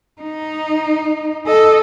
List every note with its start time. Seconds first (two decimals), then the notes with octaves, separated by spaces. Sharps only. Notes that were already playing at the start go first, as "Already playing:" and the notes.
0.22 D#4
1.47 A4 D#5